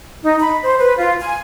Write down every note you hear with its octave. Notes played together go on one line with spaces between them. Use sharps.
D#4
B5
C5
B4
F4
G#5